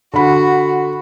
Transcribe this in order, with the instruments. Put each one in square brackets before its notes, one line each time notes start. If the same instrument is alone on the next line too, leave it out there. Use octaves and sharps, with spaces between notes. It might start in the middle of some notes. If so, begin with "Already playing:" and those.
[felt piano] D3 B5 [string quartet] F#4